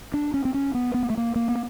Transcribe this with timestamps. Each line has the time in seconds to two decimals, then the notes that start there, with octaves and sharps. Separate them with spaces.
0.14 D4
0.34 C#4
0.45 C4
0.54 C#4
0.74 B3
0.94 B3
1.03 A#3
1.10 A3
1.17 A#3
1.36 A#3
1.48 B3